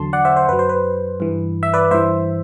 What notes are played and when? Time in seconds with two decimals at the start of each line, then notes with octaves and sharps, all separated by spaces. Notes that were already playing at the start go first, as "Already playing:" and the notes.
Already playing: E2 D3 F#3 A5 C6
0.13 D5 F#5
0.25 C5 E5
0.37 C5
0.48 F#2 F#3 B4
0.59 C5
0.69 B4
1.20 G2 E3
1.63 E5
1.74 B4 D5
1.91 G2 E3 C5 E5